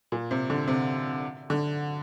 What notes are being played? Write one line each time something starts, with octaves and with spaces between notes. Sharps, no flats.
A#2
C3
D3
C3
D3